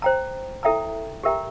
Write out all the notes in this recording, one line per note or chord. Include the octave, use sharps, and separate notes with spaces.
C5 G5 A#5
E4 A4 E5 G5 A#5
G4 A#4 E5 G5 A#5